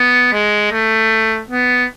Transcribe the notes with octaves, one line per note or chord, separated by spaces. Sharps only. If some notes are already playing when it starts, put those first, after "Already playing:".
Already playing: B3
G#3
A3
B3